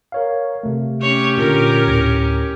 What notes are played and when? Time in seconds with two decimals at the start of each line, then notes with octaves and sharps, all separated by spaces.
0.12 A#4 C#5 F5
0.63 C3 A3
1.02 C#4 G4 C#5
1.38 A#2 D3 A#4
1.88 D2 A2 G#6